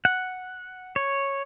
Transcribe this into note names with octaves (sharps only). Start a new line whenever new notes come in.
F#5
C#5